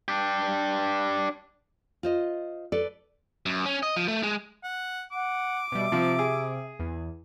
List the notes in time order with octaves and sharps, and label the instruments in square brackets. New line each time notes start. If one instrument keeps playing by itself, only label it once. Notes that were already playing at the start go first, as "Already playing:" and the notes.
[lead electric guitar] D4 G4
[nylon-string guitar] F4 C5 D#5
A4 B4 D5
[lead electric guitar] F#2
C#4
D#5
F3
A3
G#3
[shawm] F#5
[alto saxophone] F#5 [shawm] D6
[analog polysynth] B2 G3 [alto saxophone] E5
[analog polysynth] C3 [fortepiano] F3
[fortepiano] G#4
[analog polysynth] E2